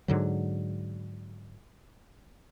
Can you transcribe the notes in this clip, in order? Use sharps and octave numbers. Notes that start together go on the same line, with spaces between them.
G#2 D3 F#3